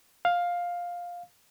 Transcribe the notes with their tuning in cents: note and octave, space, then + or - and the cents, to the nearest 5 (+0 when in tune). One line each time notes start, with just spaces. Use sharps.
F5 +10